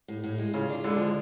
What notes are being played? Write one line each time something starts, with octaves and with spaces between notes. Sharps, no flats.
A2
A2
G#3
C#3 F4
D4
D3 G#3
F3 F4